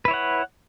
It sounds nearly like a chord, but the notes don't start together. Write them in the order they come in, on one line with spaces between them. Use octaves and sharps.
B4 E4 C#5 F#5